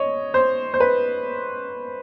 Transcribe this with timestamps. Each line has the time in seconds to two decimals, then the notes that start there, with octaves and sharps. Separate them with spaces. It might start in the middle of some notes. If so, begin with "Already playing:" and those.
Already playing: C#5 D#5
0.34 C5
0.74 C5
0.80 B4